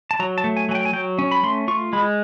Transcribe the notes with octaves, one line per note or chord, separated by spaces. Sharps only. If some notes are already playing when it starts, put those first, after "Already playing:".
A5
F#3 A#5
A5
A3
G#5
F#3 G#5
G5
G#5
F#3 G5
C#4
B5
A3 C6
F4 C#6
G#3 B5